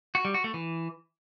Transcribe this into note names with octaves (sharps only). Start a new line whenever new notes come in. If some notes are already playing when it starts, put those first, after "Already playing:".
F#4
G3
F#4
A3
E3